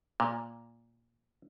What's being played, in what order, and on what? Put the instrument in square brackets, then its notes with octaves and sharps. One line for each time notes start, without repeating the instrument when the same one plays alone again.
[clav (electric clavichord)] A#2